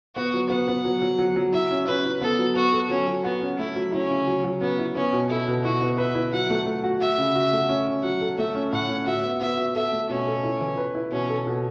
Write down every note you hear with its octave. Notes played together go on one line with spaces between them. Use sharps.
B3 F#4
F#3
B3 F#5
B3
F#3
F#3
F#3
F#3
E4 E5
C#4
C#4 B4
E4
B3 A4
F#3
B3 F#4
A4
F#3 C#4
F#3
B3 F#4
C#4
A3 E4
F#3
C#4 E4
C#3
F#3
F#3
B3 C#4
E4
B3 C#4
B2
E4 A4
B2
E4 F#4
B3
B4 E5
E4
F#3 F#5
A3
A3
F#4
F#4 E5
C#3
F#4
A3
C#4
C#4
F#3 F#5
A4
A3 E5
C#4
A2 F#5
C#4
F#4 E5
B3
B3 E5
F#4
A4 E5
A3
B2 C#4
A4
E4
E3
B4
E4
B2 C#4
A4
B2